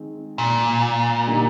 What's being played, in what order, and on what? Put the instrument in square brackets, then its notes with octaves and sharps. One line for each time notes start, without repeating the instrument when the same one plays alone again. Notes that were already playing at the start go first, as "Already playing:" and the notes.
Already playing: [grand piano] D#3 G#3 C4
[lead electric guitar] A#2
[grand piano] D3 G3 A#3 D#4